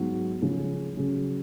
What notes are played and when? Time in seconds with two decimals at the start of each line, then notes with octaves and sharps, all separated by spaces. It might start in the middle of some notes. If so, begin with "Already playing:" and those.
Already playing: G#2 F#3 B3 F#4
0.41 C#3 F3 G#3 C#4 G#4
0.97 C#3 F#3 C#4